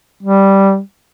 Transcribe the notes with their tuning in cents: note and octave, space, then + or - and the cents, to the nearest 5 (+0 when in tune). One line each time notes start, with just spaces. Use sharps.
G3 -5